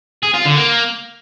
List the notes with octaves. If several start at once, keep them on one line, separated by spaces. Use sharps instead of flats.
G#4
F4
D3
A#3